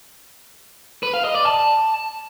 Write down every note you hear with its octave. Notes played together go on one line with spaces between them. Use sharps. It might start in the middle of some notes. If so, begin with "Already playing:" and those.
B4
F5
D#5
D5
A5